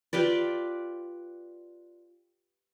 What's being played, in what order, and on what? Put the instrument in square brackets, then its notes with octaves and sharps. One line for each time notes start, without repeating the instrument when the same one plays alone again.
[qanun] F4 G4 B4 D5